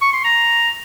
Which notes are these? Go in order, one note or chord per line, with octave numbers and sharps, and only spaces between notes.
C#6
C6
A#5